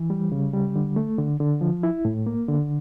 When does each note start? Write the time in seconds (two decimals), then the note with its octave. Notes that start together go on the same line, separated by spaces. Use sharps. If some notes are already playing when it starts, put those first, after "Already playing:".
Already playing: E3
0.10 G3
0.32 C#3
0.54 G3
0.76 D3
0.96 A3
1.19 D3
1.40 D3
1.61 F3
1.83 E4
2.05 A2
2.26 A#3
2.48 D3